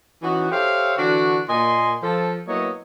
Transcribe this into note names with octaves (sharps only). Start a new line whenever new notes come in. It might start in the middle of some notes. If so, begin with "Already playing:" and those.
E3 C#4 D#4 F#4
G4 A4 C5 C#5 E5 F5
D3 E3 D4 F#4
A#2 A#3 D#5 G#5 C6
F3 A4
F#3 A#3 B3 E4 C#5 D#5